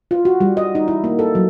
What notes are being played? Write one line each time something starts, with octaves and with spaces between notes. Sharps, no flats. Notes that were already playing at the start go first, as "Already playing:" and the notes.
F4
F#4
G3
D#5
D#4
E4
A#3
A4
F#3